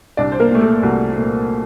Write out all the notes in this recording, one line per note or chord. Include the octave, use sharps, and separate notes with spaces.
C2 D4 D5
C5
A#3 A#4
A#2 A3
A3 A4
C2 F#4
A#2 A3